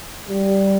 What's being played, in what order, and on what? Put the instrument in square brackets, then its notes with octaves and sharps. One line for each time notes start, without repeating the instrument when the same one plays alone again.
[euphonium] G3